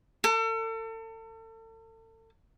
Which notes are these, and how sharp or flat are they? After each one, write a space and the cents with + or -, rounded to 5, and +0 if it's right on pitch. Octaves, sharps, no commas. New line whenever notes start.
A4 +35